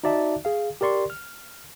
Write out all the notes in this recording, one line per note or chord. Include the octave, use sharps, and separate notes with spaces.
D#4 F#4 D5 E5 A5
G#4 F5
G4 A#4 D5 C6 C#6
F6